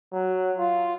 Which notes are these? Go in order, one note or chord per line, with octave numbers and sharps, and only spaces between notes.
F#3
F4